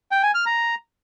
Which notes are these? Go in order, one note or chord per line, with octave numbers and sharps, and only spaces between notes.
G5
G#5
F6
A#5